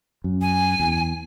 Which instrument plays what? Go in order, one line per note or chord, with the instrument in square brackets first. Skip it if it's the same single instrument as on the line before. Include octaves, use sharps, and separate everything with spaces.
[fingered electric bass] F#2
[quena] G#5
[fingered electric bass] E2